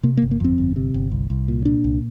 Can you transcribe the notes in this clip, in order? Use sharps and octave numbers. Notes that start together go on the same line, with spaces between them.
C3 A#3
A#3
G1
A#3
F2 C4
G1
C3
G1
C2
C2
A#2
A#2 D4
C2